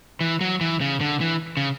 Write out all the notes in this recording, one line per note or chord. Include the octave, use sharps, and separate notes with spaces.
E3
F#3
E3
C#3
D3
E3
C#3